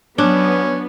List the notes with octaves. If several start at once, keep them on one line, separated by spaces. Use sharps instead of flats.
F#3 B3 C#4 D4